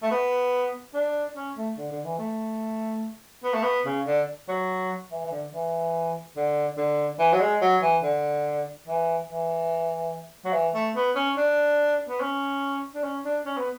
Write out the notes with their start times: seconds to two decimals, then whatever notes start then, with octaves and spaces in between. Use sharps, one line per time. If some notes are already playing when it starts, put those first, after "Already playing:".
0.03 A3
0.11 B3
0.94 D4
1.36 C#4
1.56 A3
1.77 D3
1.92 D3
2.05 E3
2.19 A3
3.44 B3
3.54 A3
3.63 B3
3.85 C#3
4.06 D3
4.48 F#3
5.11 E3
5.25 E3
5.32 D3
5.54 E3
6.37 D3
6.78 D3
7.19 E3
7.33 F#3
7.41 G#3
7.62 F#3
7.82 E3
8.03 D3
8.87 E3
9.29 E3
10.45 F#3
10.53 E3
10.75 A3
10.96 B3
11.16 C#4
11.37 D4
12.09 B3
12.21 C#4
12.95 D4
13.04 C#4
13.25 D4
13.45 C#4
13.57 B3